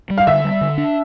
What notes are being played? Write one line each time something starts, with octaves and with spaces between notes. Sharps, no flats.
G3
F5
D3 E5
G3
D3
D4